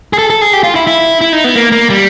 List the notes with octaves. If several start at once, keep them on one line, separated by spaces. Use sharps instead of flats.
G#4
A4
A4
G#4
G4
F4
E4
E4
E4
D#4
B3
A#3
A#3
G3